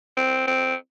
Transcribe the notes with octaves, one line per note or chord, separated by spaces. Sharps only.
C4
C4